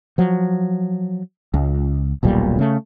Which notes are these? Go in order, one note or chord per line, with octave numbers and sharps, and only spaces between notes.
F3 F#3
C#2
D#1 B1 A#2 G3
C#3 A3